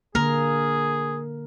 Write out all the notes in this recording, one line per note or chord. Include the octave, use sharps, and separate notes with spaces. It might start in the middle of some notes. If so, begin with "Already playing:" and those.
D3 A#3 G#4 A#4